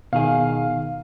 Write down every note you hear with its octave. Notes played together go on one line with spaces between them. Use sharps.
B2 D#3 G#4 F5